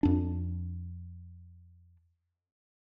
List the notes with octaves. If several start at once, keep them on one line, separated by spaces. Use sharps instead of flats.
F2 D4